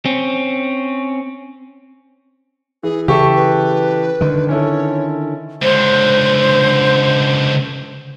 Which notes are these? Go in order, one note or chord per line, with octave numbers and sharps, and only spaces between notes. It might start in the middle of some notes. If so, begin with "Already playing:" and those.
C4 C#4
E3 G#4
C#3 E3 G4 A4 E5 C#6
B4
D3 D#3
C#4 E4 A4 C#5
C#2 D3 C5